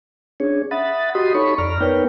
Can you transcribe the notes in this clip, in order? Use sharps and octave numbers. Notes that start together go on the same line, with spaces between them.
C#4 D4 G#4 C#5
E5 F#5 B5 D#6 A6
F#4 G4 D#5 B5 C6 D#6
D#4 A4 C#5 B5 C#6
F2 D5 A#5 F6
B3 D#4 A#4 B4 C#5 G5